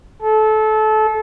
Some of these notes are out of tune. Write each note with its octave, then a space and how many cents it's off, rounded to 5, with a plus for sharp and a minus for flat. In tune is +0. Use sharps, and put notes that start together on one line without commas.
A4 -25